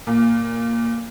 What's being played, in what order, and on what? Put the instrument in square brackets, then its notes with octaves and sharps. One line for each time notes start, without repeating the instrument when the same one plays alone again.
[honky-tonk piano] A#2